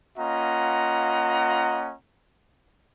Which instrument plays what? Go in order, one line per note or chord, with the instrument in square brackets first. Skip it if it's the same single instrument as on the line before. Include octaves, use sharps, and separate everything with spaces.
[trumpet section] A#3 C#4 F4 D#5 F#5 A#5